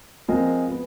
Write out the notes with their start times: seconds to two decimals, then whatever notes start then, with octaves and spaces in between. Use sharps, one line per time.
0.28 F3 G#3 C4 F4 A#4
0.71 B3